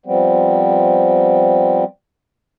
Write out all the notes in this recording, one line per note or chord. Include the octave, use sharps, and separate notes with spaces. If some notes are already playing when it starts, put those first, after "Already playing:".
F3 G3 B3 C4